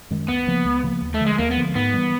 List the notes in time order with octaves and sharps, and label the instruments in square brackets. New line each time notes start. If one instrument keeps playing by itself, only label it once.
[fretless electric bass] F#2 D#3 G#3
[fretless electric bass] C#2 [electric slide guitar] B3
[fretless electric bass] C#3 F3 A#3
C#2
C#3 F3 A#3
D#2
[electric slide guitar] A3
[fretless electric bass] D3 F3
[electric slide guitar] G#3
[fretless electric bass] D#2 [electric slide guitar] A#3
[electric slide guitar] B3
[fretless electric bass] D3 F3
[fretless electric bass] G#2 [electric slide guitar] B3
[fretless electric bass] E3 G3